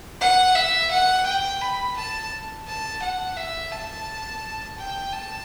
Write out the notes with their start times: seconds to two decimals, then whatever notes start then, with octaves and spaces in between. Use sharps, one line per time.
0.21 F#5
0.56 E5
0.91 F#5
1.27 G5
1.61 B5
1.97 A5
2.68 A5
3.03 F#5
3.37 E5
3.72 A5
4.79 G5
5.13 A5